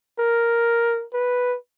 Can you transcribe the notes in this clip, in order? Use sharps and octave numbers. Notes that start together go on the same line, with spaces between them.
A#4
B4